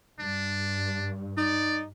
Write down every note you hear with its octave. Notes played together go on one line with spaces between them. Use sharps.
G2 D4
D#4 D5